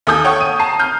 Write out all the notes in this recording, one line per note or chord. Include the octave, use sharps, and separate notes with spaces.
D#2 A4 G#5 D#6 G6
C#5 F#5 G5 C#6
D#7
A5 A#5 C7
F6 G6